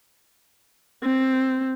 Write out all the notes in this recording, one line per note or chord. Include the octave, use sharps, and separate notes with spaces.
C4